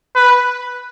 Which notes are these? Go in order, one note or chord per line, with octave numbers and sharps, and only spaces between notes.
B4